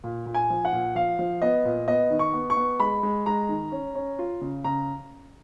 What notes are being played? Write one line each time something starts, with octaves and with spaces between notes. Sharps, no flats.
A#2
A#2
G#5
F3
F#5
A#2
F3 F5
F3
B3 D#5
A#2
B3 D#5
D#3
C#6
B3
C#6
B3
G#3 B5
G#3
G#3 A#5
D#3
C#4
C#4
F4
C#3
C#3 A#5